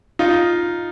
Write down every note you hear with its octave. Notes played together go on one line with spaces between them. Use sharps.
D#4 F4